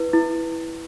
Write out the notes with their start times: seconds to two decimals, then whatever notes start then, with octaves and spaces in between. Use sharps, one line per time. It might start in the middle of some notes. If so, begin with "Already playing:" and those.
Already playing: E4 B4
0.13 E4